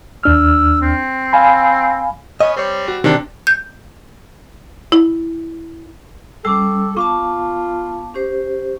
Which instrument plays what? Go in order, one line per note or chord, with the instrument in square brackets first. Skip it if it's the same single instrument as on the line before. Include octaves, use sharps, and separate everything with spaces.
[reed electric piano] D#2 D4 F6 [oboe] E6
[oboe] C4
[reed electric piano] F5 G#5 B5
[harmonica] B3 C#4 [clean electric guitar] D#5
[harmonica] G3 C4 [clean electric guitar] C5 C#5
[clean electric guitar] F#4
[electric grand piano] C3 D4 [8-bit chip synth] D#3
[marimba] G6
E4
[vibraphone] G3 C#4 [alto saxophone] A4 [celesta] D6 E6
[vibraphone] B3 F5 A5 [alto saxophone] F4 [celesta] C#6 D6
[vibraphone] C#4 G4 C5